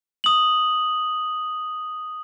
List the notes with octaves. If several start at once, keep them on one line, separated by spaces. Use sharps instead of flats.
D#6 F#7